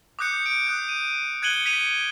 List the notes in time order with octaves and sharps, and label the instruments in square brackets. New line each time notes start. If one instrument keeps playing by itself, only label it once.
[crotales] D6 D#6 F#6 G6 C#7
D7
D#6 F#6 G6
D#7
F#6 G#6 C#7 D#7 F#7 G7
B6 C#7 D#7 F7